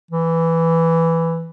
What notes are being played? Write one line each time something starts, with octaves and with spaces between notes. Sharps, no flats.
E3